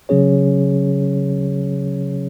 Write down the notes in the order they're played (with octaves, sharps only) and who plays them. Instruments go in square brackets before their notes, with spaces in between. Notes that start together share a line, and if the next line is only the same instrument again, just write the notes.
[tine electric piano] C#3 F#3 C#4 G#4 C#5